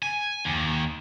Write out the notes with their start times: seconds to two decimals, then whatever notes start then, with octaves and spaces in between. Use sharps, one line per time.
0.03 G#5
0.45 D#2